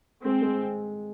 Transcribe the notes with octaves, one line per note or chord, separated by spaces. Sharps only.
G#3 C4
G#3